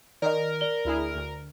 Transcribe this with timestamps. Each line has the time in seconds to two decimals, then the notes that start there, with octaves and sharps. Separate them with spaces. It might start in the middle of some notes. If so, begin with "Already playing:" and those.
0.22 D#3 A#4 D5 D#5
0.61 D5 G7
0.85 D2 E4 G#4
1.15 D2